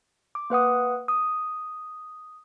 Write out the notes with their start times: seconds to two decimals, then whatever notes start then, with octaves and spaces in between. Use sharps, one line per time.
0.35 D6
0.50 A#3 B4 F#5 D#6
1.08 D#6